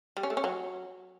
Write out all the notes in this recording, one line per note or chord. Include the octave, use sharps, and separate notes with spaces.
G3
C#4
A3
C#4
F#3